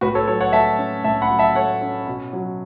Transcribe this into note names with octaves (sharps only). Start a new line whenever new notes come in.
A2 F#4 B4
A4 C#5
F#3 A4 C#5
C#5 F#5
A3 E5 A5
C#4
A2 E5 A5
F#5 B5
F#3
E5 A5
A3 C#5 F#5
C#4
B2
F#3